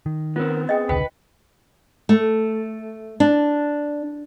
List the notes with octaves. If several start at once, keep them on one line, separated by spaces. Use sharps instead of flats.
D#3
B3 C4 F4 A#4
G#4 D#5 G5
E1 C#2 D3 B4 G5
A3
D4